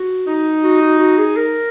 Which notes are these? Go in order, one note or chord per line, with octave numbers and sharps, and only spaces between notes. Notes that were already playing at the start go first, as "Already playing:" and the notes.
Already playing: F#4
D#4
F#4
F#4
F#4
G#4
A#4